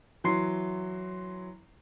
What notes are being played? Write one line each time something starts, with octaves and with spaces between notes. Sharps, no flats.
E3 F#3 C6 C7